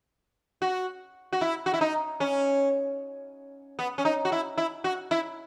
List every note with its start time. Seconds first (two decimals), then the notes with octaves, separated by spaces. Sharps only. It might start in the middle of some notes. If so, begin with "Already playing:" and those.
0.62 F#4
1.33 F#4
1.41 E4
1.66 F#4
1.74 E4
1.81 D#4
2.20 C#4
3.79 B3
3.98 C#4
4.05 D#4
4.25 F#4
4.32 E4
4.58 E4
4.84 F#4
5.11 E4